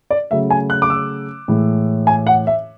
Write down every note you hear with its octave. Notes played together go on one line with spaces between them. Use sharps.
D5
C#3 F#3 A3 E5
G#5
F#6
D6
E6
A2 E3 G#3
G#5
F#5
E5